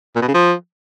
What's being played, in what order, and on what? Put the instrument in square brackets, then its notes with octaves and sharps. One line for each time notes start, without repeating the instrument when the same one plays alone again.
[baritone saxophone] A#2
B2
C#3
F3